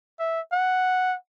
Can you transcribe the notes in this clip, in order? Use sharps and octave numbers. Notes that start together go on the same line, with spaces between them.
E5
F#5